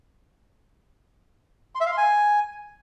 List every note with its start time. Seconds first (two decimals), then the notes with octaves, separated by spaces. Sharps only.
1.75 C6
1.81 E5
1.86 F5
1.92 C6
1.97 G#5